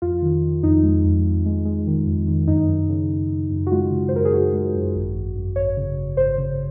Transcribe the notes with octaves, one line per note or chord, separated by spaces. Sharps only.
F2 F4
D#3
D#3
F2 D#4
G#3
F2
F2
G#3
G#3
D#3
F2
D#3
F#2 D#4
F#2
C#3
F#2
F#2
F#2
F#4
G#3 F4
C#3
C5
F#2 A#4
G#4
F#2 F#4
G#3
F#2
G#1
G#1
F#2
G#1 C#5
C#3
G#1
G#1 C5
C#3